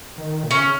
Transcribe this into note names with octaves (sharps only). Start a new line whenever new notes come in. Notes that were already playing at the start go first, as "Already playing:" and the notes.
D#3
A#2
C#3 C#4